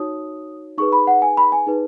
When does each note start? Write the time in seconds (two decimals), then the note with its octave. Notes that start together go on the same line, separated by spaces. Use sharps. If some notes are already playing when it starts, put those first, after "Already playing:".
Already playing: D#4 F#4 C#5 D#6
0.78 D#4 G#4 B4 C#6
0.92 B5
1.07 F#5
1.22 G#5
1.37 B5
1.52 G#5
1.67 D#4 G#4 B4